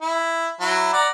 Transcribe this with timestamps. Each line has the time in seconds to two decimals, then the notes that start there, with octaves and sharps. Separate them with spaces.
0.01 E4
0.60 F#3 E4
0.93 D5 F#5 A#5